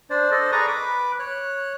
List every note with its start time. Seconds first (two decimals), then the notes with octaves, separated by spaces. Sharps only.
0.10 D4 C5 D5
0.31 A4 C5 D5 D#5
0.52 G#4 B4 D5 A#5 C#6 D#6
0.68 B4 B5 D6
1.19 C#5 F#6